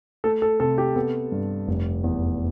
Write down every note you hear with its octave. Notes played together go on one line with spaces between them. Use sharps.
A3 A4
A4
C3 A4
G4
B3 A4
G2
F1
E2